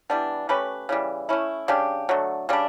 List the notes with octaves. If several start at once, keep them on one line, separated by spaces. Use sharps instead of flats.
E3 G3 B3 D4
A3 C#4 G4 B4
C#3 E3 G3
A3 C#4 E4
C#3 G3 D4 G4
D3 F#3 A3
C#3 G3 D4